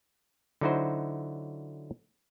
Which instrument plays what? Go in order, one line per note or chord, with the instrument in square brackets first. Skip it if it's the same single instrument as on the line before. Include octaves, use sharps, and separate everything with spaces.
[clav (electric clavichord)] D3 F#3 D#4 E4 F#4 C5